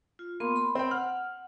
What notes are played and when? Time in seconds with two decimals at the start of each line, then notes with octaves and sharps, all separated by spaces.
0.19 F4
0.40 A#3 B3 C6
0.56 B5 C6
0.75 C4 G5
0.91 F#5 F6